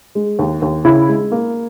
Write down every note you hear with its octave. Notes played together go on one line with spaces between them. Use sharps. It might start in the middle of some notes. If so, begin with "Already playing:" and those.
G#3
D#2
D#2
C#3 E4
G#3
A#3